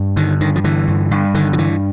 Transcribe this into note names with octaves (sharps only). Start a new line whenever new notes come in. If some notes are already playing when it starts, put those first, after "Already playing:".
Already playing: G2
D3 D#3
G2 D#3
F3
D3 E3
G2
G2
D3 D#3
F3
G2 E3